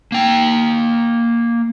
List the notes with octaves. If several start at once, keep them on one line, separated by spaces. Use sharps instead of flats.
A#3 G5